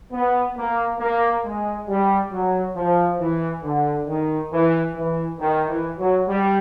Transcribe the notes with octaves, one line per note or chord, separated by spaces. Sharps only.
B3
A#3
A#3
G#3
G3
F#3
F3
E3
D3
D#3
E3
E3
D#3
E3
F#3
G3